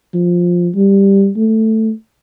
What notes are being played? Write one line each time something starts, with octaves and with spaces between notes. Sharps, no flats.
F3
G3
A3